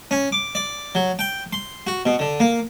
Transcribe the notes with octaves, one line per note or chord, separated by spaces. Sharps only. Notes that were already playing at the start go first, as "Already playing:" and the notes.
C#4
D6
D5
F#3
G5
C6
F#4
B2
D3
A#3